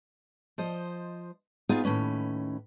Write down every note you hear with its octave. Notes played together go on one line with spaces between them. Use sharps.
F3 C5 D#5
B3 D#4 F4 G#4 F5 G#5
D#2 A2 C#4 B4